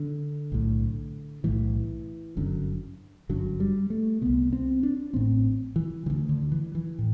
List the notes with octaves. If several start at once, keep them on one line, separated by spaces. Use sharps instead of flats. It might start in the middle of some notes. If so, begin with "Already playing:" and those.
Already playing: D3
B1 A2
B1 A2 E3
G1 F#2 D3
G1 F#2 D3 F#3
G3
A3
C2 C3 B3
C4
D4
A1 A2 C4
E3
D2 D3 E3
D3
E3
E3
A2